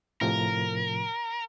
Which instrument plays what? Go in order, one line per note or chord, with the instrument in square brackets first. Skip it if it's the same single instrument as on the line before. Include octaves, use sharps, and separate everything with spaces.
[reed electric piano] A2 C3 F3 [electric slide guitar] A#4